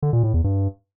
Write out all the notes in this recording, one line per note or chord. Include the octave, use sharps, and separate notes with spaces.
D3
A#2
A2
E2
G2